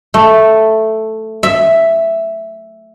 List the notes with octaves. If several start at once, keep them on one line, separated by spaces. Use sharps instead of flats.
A3
E5